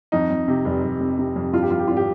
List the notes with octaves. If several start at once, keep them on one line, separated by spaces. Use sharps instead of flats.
F2 D#4
F2
C3
F1
F1
F2
C3
F2
G2 F4
G4
F3 F4
G4
G#1 F4
G4